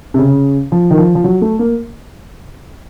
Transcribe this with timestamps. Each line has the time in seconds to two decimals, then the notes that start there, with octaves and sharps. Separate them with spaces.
0.14 C3
0.19 C#3
0.72 F3
0.91 D#3
0.98 F3
1.15 F3
1.24 F#3
1.42 A3
1.59 A#3